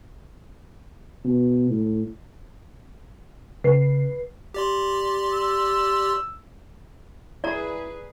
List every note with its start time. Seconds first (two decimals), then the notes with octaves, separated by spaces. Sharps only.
1.25 B2
1.70 A2
3.64 C#3 B4 C7
4.54 G4 D5 C6
5.33 E6
7.44 E4 G#4 B4 D5 A#5